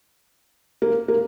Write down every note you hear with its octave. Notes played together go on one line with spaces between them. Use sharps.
A#3
A#3